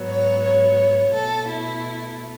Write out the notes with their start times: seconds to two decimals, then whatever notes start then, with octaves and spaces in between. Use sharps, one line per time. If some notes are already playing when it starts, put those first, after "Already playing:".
Already playing: G#2 F#3 B3
0.09 C#5
0.44 C#5
1.13 B2 A3 A4
1.48 E4